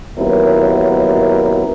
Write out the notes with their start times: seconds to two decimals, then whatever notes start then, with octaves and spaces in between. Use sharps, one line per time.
0.18 D#2 F#3 B3 C#4 E4 A#4